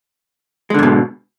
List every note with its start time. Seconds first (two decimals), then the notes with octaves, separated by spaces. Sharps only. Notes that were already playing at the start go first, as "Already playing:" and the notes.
0.70 G#3
0.74 D3
0.79 G#2
0.83 B2